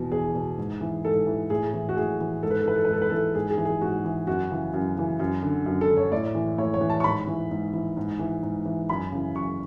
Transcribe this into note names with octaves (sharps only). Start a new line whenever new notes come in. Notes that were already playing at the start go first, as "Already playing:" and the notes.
Already playing: E2 B2
E2 G#4
B2
G#2
E3
G#2 A4
E3
A2 G#4
E3
F#4
A2 G#4
E3
G#2 A4
B4
A4
E3 B4
A4
B4
G#2 A4
B4
E3 A4
G#2 G#4
G#4
E3
G#4
G#2 F#4
E3
F#2 F#4
C#3 E3
F#2
C#3 E3
F#2
D3
F#2
A4
D3
C#5
A2 D5
E3
A2 C#5
C#5
E3
A5
C#6
G#2 B5
E3
G#2
E3
G#2
E3
G#2
E3
F#2 B5
C#3 E3
F#2 C#6